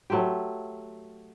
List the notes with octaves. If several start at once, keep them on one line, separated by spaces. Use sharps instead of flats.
F#3 A3 F4 G4